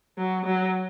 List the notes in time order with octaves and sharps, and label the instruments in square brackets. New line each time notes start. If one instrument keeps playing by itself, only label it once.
[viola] F#3
F#3